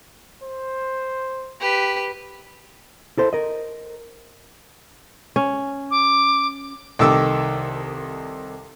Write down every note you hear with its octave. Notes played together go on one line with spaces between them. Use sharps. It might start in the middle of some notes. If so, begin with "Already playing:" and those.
C5
G4 B4
E4 A4 C5
A#4 D#5
C#4
D6
C2 D#3 A4 D6 E6